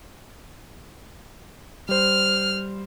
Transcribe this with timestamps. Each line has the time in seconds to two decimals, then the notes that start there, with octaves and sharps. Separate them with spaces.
1.89 G3 C5 F6